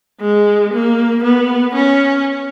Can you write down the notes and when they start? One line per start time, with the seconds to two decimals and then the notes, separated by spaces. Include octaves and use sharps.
0.21 G#3
0.73 A#3
1.24 B3
1.75 C#4